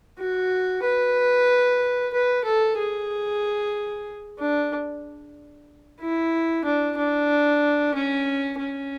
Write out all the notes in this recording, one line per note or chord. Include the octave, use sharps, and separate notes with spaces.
F#4
B4
B4
A4
G#4
D4
E4
D4
D4
C#4
C#4